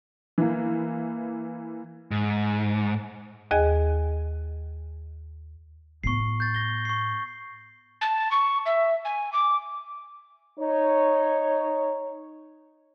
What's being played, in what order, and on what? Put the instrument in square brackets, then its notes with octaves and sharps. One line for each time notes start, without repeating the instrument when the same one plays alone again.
[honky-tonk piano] E3 A#3
[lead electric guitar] G#2
[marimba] D#2 G#4 D#5 G#5
[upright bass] A2 B3 [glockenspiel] C#6 C7
[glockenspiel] G6 A6
A#6 G7
C#6 C7
[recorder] A5
C#6
E5
G#5
D6
[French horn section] D#4 C#5